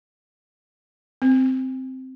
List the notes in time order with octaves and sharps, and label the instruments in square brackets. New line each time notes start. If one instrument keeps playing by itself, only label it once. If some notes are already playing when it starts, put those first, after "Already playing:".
[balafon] C4